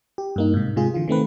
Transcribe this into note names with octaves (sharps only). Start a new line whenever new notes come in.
G4
G2 A#3 D#4
G#2 C3
C3 G#3 F4 G#4
D3 E3 F4
D#3 A3 C4 B4